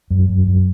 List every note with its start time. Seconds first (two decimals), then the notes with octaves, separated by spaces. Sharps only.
0.11 F#2
0.29 F#2
0.47 F#2